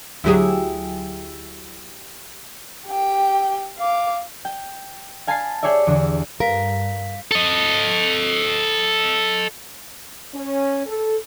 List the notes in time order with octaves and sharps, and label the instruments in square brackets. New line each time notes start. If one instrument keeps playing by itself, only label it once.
[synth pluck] D2 F#3 [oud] E4 G4 G#4
[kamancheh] G4 G5
F5 D6
[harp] G5
F5 G#5 A5 B5 A6 C7
G4 G#4 C#5 D5 E5
E2 D3
[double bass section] G2 [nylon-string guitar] A#4 [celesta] F5 B6
[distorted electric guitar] A4 D#5
[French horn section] C#4
A4